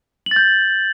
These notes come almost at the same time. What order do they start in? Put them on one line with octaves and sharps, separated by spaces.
F#7 A6 G6